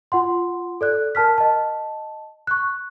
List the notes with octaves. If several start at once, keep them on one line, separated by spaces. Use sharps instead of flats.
F4 F#5 C6
A4 D5 F#6
A#4 A5 F6 B6
D#5 A5
C#6 F#6